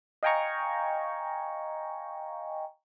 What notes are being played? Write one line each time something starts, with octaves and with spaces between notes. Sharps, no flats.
D#5 F5 G5 G#5 A#5 C#6